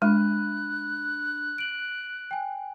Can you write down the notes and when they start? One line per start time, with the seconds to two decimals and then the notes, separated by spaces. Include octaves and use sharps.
0.02 G#3 D4 B5 F#6
1.58 D7 F#7
2.31 G5 G#5